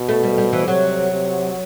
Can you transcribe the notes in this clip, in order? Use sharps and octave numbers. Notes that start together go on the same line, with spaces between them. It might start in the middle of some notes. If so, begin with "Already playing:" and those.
Already playing: B2
A3
G3
G3
E3
C3 F#3
C3